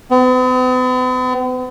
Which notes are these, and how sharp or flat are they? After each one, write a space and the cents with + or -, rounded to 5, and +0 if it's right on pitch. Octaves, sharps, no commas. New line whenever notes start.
B3 +45